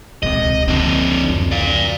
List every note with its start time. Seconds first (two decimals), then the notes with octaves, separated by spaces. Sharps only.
0.23 D#1 C#2 C3 D#5
0.68 C#2 D3 F3 C4 D4
1.28 F2
1.52 D5 F5